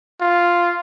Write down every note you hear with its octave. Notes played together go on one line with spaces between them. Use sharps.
F4